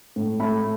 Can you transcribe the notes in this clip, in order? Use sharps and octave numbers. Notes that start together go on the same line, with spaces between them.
A2
A3 B5